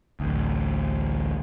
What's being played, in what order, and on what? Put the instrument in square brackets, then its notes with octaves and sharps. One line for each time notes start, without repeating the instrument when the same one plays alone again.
[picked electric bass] A1 D2